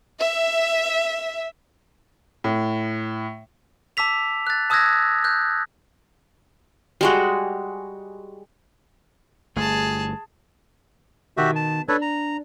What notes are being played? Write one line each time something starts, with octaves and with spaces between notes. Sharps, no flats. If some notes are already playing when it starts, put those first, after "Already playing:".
E5
A2
A5 D6 E6 B6 F7
F#6 A6
A5 D#6 E6 F#6 G#6 A#6
F#6 G6
G3 G#3 F#4
G1 A3 G#4 A5
B2 D#3 F#4 G4 E5
A5
D4 A4 B4 C#5
A#5